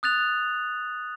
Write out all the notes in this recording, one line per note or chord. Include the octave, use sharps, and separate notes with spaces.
D#6 F#6 A6 F7